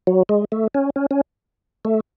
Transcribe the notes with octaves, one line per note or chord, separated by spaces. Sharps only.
F#3
G#3
A3
C#4
C#4
C#4
A3